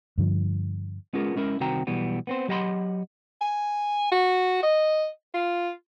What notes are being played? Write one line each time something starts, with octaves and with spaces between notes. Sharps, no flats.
G2 D3 F3
G#3 B3 C#4 F4 G#4 A#4
G#3 C#4 E4 A#4
C2 D#3 C4 F#4 G5 A#5
B1 B2 E3 G3 B3
B3 C4 C5
F#3 G4 D#5 F#5 B5 C6
G#5
F#4
D#5
F4